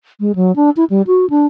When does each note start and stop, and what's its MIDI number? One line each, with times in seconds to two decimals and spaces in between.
0.20 0.35 56
0.35 0.54 54
0.56 0.70 62
0.77 0.85 64
0.90 1.02 55
1.07 1.29 66
1.30 1.46 62